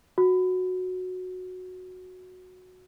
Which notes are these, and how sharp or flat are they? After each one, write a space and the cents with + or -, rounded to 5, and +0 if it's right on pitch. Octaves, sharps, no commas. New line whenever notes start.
F#4 -10